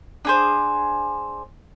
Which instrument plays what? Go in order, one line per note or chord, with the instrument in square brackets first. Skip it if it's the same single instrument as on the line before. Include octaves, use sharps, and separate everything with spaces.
[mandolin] D4 G#4 C5